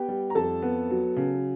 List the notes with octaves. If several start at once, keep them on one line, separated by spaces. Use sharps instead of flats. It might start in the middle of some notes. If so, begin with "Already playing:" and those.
Already playing: B3 G4 G5
G3
A#5
F2 A4 A5
B3
F#3
C#3